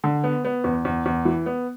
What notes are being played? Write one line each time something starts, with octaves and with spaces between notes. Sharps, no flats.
D3
B3
B3
E2
E2
E2
E3
B3